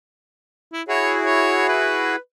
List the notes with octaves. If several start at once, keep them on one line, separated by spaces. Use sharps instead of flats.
E4
E4 F#4 G#4 C#5
C#5
B4